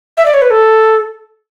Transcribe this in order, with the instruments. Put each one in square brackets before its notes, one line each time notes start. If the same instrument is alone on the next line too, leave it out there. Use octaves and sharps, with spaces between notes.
[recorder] E5
D5
C#5
B4
A4